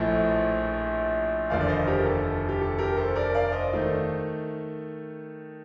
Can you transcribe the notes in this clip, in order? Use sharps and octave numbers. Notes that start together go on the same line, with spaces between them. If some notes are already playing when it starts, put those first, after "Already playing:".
Already playing: A#1 A2 F3 A3
F1 D#2 D3 F3 D5 F5
D5
C5 D#5
G4 A#4
A4
G4
A4
G4 A#4
A4 C5
A#4 D5
D5 F5
C5 D#5
D#3 A3